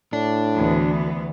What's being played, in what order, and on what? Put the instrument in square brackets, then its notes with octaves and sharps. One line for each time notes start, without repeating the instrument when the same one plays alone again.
[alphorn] A2 [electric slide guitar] D4
[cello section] D2 E3 B3